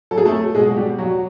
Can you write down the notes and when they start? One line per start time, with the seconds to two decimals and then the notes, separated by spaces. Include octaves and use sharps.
0.11 F#3 A4
0.18 G#4
0.25 A3 A4
0.55 B2 G#3 G#4
0.70 F#4
0.76 G3 G4
0.98 F#3 F#4